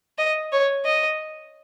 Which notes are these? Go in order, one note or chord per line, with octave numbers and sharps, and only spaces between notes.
D#5
C#5
D#5